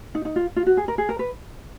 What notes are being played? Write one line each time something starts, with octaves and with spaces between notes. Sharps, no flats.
D#4
D#4
F4
F4
F#4
G#4
A#4
G#4
A#4
B4